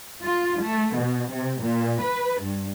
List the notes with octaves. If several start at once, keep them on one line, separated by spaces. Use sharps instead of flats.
F4
A3
B2
C3
A#2
B4
G2